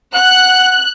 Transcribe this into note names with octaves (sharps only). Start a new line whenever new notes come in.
F#5 F#6